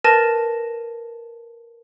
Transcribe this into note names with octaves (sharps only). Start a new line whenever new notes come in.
A#4 B4 A5 A6 A#6 D#7